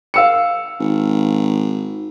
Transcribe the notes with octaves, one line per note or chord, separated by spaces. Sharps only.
F5 E6 C#7
G#1